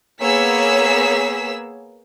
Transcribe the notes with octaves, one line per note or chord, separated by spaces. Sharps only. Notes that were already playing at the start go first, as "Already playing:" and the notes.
A#3 B3 G#4 C#5 E6 B6